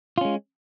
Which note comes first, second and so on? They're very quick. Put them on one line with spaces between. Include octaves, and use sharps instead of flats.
F4 C#4 G#3